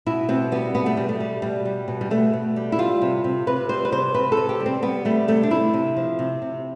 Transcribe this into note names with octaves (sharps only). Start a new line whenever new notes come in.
B2 E4
B2 C4
G3 B3
B2 B3
A3
B2 G3
A3
G3
B2 G3
G3
B2
G3
B2 A3
B2
G3
E4
G3 F4
C3
C3
C3 B4
G3 C5
B4
C3 C5
C3 B4
A4
C3
G4
G3
C4
G3 B3
G3 A3
C3 A3
D4
C3 E4
C3
F3
C3
C3